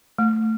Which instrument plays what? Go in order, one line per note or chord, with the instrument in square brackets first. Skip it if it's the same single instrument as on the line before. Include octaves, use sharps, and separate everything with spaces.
[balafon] A3